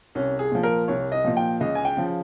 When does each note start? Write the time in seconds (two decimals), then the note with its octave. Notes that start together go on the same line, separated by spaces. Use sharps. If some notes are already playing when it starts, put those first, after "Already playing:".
0.15 C2 C#4
0.39 G#4
0.51 A#2 F3
0.63 A#4
0.88 C2 C#5
1.12 D#5
1.25 A#2 F3
1.37 G5
1.60 C#2 D#5
1.75 G#5
1.85 G5
1.97 C#3 F3